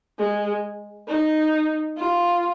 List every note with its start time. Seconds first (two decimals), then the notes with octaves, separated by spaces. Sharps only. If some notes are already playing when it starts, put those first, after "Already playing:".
0.18 G#3
1.08 D#4
1.98 F4